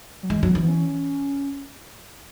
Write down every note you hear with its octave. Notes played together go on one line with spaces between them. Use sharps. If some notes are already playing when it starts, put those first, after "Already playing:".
F#3
E3 G#3
F#3
B3
E3
B3
C#4